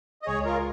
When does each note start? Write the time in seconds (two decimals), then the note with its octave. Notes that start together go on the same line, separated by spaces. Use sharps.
0.22 D#5
0.26 C#2 C#3 G#3 G#4 C#5
0.45 F4 A#4